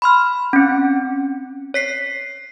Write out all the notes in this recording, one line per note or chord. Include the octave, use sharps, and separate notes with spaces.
B5 C6 F6
C4 C#4
C#5 B6 C7